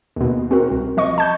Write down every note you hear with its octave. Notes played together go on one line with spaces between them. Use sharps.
D#2 B2
C4 F#4 A#4
C2
F3 D#5 C#6
A5 G6